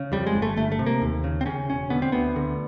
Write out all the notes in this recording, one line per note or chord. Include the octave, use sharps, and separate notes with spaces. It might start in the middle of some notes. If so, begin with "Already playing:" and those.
Already playing: C#3
F2 G3
G#3
G1
A3
G1 A3
A3
C3
A#3
D#2
C#3
C4
C#3 C#4
E1 C#4
D3 B3
C4
D2 B3
D3